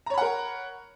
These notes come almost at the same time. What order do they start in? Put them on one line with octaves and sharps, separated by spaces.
A#5 C#5 B5 F#5 A#4